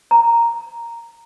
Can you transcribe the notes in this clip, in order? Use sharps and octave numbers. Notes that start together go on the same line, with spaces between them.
A#5